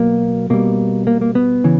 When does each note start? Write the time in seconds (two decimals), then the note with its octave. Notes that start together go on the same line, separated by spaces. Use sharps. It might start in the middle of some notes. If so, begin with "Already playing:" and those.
Already playing: B2 F#3 A#3
0.50 B2 G3 A#3
1.07 A#3
1.21 A#3
1.35 B3
1.64 C#3 E3